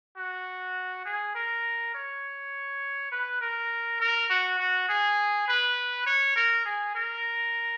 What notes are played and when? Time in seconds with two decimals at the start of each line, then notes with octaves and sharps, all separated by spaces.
0.17 F#4
1.05 G#4
1.35 A#4
1.94 C#5
3.12 B4
3.41 A#4
4.00 A#4
4.30 F#4
4.59 F#4
4.89 G#4
5.48 B4
6.06 C#5
6.36 A#4
6.65 G#4
6.95 A#4